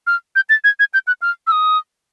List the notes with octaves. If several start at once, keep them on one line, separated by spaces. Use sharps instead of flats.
F6
G6
A6
G#6
G#6
G6
F#6
F6
E6
D#6